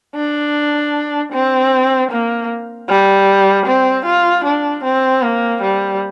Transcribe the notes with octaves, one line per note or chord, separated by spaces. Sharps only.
D4
C4
A#3
G3
C4
F4
D4
C4
A#3
G3